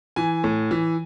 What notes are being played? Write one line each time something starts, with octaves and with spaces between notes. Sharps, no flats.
E3 G#5
A2
E3